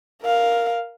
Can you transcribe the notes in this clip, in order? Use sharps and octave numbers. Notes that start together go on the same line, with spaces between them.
A#4 F5